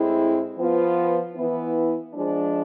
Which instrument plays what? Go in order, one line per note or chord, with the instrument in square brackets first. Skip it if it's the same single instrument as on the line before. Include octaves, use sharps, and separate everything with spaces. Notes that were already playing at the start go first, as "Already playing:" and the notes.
Already playing: [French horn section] A2 G#3 C4 E4
F3 B3 F4
E3 B3 E4
F3 G#3 D4